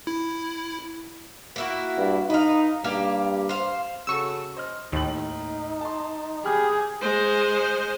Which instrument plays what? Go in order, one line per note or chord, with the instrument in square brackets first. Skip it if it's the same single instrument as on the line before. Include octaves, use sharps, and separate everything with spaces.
[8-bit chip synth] E4
[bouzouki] A#3 E4 F#4
[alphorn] G2
[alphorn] D#4 [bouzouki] B4 F5
[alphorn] G2 [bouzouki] A#3 G4 F5
[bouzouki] C5 F5
[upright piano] C#3 F#4 A4 [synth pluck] C#6 E6
[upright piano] C5 D#5 F6
[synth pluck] D#2 [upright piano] A2 F#7 [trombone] D#4
[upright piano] A5 C6
[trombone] G4 [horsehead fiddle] G#4 [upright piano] B5 F6
[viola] G#3 C5